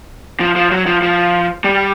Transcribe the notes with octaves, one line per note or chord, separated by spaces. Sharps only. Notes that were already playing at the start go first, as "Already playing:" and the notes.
F3
F3
F#3
F3
F3
G3